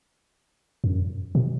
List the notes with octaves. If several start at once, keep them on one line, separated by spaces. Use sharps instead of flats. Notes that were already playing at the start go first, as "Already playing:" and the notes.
F#2
B2